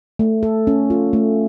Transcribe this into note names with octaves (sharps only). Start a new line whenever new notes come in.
A3
A4
C#4
F4
A3